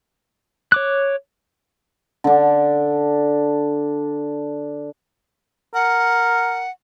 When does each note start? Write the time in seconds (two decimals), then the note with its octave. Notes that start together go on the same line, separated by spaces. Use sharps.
0.72 C#5 D6 F#6
2.24 D3 D4
5.74 A#4 F#5